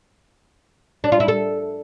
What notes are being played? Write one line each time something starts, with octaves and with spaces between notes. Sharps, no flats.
D4
F4
E4
A4